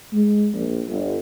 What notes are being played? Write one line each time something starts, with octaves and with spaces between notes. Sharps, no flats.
G#3
A#1
G1